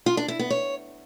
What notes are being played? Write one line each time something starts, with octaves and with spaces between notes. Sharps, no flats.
F4
D4
E4
B3
C#5